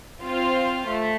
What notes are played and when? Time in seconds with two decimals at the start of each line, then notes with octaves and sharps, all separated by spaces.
0.23 C4 F4 C5 F5
0.88 A3